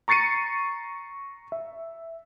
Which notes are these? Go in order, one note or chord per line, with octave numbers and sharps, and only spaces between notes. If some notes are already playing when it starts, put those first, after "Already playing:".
A#5 C#6 A6 C7 C#7 D#7
E5